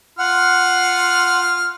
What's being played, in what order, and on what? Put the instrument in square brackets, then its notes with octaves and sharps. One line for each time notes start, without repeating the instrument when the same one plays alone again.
[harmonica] F4 C6 F6 [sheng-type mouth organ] F#5